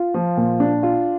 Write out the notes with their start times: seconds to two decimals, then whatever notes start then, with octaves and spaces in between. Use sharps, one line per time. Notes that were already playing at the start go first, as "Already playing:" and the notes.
Already playing: F4
0.14 F3
0.37 A#2
0.60 D4
0.83 F4